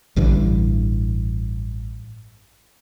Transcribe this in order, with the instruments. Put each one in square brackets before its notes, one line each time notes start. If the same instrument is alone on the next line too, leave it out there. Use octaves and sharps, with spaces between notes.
[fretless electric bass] A1 G2 D3 E3